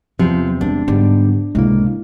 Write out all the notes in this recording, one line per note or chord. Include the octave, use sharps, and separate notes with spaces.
E2 C3 F3
G#3 D4
G#2 D3 G3 B3
C#2 A2 C3 G#3 A#3 E4